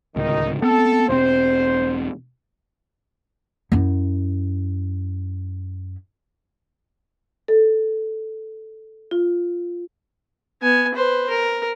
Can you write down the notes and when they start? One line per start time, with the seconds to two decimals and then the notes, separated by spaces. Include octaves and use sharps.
0.16 D1 C#2 D#3 D#4
0.62 B3 C4 A4
1.09 E1 C4 C5
3.72 F#2 E4
7.48 A4
9.11 F4
10.62 B3 G#5
10.95 B4 C5
11.30 A#4